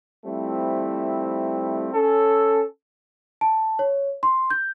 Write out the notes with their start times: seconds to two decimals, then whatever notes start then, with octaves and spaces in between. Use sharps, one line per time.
0.25 F3 G3 A3 C4 E4
1.94 C#4 A4
3.41 A5
3.79 C#5
4.23 C6
4.50 G6